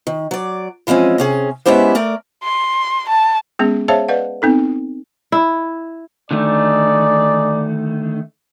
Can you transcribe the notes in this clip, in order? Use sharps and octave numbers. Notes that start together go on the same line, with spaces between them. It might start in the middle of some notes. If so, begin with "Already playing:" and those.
D#3
F#3 D5
E3 F3 G#3 C4 C#4
C3 C#4 G#4
G#3 B3 C#4 E4 G4 C5
A3 A#4 D5
C6
A5
G#3 B3 C#4 G#4
G#4 C5 C#5 E5 F5 A5
B4 D5 D#5 F5 F#5
B3 C4 D#4 A4
E4
D3 D#3 A3 D#4 G#4 D5